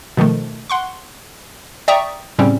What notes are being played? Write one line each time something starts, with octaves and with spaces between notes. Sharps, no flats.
B2 D#3 F3 A3
F#5 C6 C#6
D5 E5 G5 A#5 C#6 D#6
A2 C#3 G3 C4 C#4